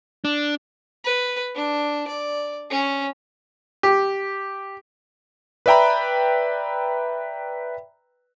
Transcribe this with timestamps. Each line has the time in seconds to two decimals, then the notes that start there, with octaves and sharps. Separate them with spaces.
0.25 D4
1.04 B4
1.55 D4
2.08 D5
2.70 C#4
3.83 G4
5.66 B4 D5 E5 G5 A#5 B5